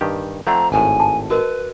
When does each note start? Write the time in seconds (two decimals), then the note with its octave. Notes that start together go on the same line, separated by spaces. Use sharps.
0.01 G2 D#3 G4
0.47 F3 A3 C4 C#5 D5 F#5 A#5
0.72 G#1 A2 G#5
1.00 A5
1.30 F#4 A#4 B4 D#5